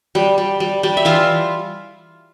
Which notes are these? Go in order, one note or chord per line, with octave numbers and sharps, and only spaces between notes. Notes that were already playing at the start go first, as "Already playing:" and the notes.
G3
G3
G3
G3
E5
E3 F4 F5